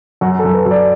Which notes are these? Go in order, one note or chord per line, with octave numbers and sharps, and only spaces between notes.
F#2 F#4
A4
F#2
B4
F#2
D5